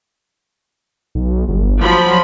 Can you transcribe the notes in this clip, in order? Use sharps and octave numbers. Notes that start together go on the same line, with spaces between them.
B1
G1
F3 F#3 B5